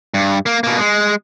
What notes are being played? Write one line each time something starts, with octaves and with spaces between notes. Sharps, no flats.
G2
A#3
B2 A#3
G#3